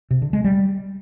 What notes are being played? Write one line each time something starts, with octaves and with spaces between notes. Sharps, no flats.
C3
D3
G#3
G3